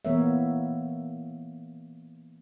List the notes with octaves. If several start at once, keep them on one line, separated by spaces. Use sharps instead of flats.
E3 A#3 B3 A#4 C#5 E5